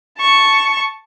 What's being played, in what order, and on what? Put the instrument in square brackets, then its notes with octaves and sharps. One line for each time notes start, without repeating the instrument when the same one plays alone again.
[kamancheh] A5 C#6